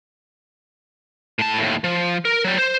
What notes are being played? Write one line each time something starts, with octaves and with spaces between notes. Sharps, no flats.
A2 A5
D#2 A2
F3
A#4
F#3 G3
C5